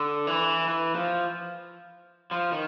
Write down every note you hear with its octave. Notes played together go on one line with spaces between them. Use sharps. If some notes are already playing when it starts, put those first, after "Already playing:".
Already playing: D3
E3
E3
F3
F3
D#3